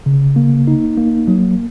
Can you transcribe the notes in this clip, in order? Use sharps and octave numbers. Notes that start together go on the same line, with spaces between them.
C#3
A#3
D#4
A#3
F#3